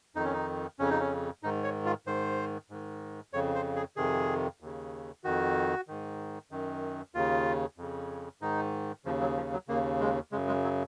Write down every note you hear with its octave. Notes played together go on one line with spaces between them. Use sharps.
F2 D#3 D#4
C#4
D#4
F2 C#3 C#4
D#4
C#4
G#2 D#3 D#4
C#5
F4
G#2 D#3 C5
G#2 D#3
F2 C#3 C#5
C5
G#4
F2 C3 D#3 G#4
D#2 C#3
F2 D#3 F#4
G#2 D#3
F#2 D#3
D#2 C#3 F4
F2 C#3
G#2 D#3 D#4
D#2 C#3 F3
F#3
F3
F#3
D#2 C#3 A#3
G#3
F#2 C#3 G#3
G#3
F#3